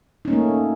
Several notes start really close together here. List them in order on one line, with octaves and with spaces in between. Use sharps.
D#4 C#4 A#3 A3